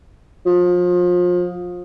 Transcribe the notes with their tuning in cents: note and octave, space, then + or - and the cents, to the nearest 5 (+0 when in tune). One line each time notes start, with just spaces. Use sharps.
F3 +30